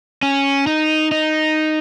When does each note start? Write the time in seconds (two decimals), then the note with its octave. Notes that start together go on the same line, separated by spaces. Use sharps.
0.23 C#4
0.67 D#4
1.12 D#4